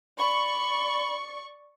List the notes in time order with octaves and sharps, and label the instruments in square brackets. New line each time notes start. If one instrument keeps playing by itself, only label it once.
[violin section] D5 C#6 [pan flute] B5